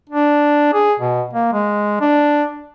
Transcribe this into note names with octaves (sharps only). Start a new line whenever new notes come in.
D4
G#4
B2
A#3
G#3
D4